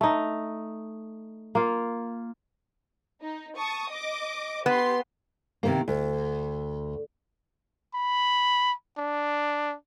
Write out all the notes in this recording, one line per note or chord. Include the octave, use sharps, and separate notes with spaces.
A3 D#4
A#3 F4
D#4
A5 C#6 D#6
D#5 D6
B3 G4 C6
C3 D#3 A#3
D2
B5
D4